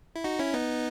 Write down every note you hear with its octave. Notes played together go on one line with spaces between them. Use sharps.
E4
D#4 F#4
C#4 E4
B3 D#4